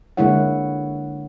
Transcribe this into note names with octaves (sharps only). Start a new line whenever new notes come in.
D3 G#3 A#3 E4 C#5 F#5